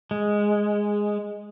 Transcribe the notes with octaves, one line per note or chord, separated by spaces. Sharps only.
G#3